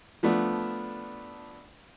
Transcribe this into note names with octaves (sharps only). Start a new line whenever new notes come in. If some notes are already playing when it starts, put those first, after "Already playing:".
F3 A3 B3 D4